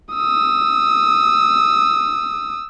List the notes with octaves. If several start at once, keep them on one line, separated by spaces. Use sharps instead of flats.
D#6 E6